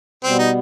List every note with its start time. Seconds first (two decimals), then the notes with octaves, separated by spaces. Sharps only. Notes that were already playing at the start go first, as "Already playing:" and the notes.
0.24 B2 G3 B3 C4
0.39 D#4